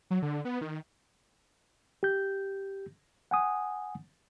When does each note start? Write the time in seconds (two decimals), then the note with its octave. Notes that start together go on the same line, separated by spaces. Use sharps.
0.10 F#3
0.22 D3
0.45 B3
0.61 D#3
2.03 G4 G6
3.31 F#5 G#5 D#6